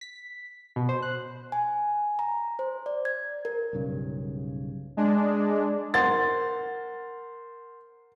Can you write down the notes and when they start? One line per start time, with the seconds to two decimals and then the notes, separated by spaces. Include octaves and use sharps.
0.01 B6
0.76 B2
0.89 C5
1.02 F#6
1.52 G#5
2.19 A#5
2.59 C5
2.86 D5
3.05 G#6
3.45 A#4
3.73 B1 G2 C#3
4.97 G#3 D4
5.94 A#4 C5 F#5 A6